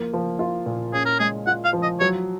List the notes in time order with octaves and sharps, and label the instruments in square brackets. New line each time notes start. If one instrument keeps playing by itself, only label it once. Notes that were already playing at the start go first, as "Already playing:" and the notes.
Already playing: [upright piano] F3 A#3
F3
F4
A#2
[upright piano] C#4 [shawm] G#4
[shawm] A#4
[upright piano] G#3 [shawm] G#4
[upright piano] F4 [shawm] F#5
[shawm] F5
[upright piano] F3
[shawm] D#5
[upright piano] F#3 [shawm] C#5